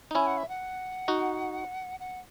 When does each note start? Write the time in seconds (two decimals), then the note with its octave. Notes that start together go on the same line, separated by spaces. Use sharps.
0.11 D#4
0.15 C#4 E4 G#5
0.27 F#5
0.38 E5
0.49 F#5
1.08 D#4 F#4
2.00 F#5